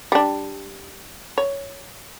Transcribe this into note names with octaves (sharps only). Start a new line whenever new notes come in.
G3 D4
C#5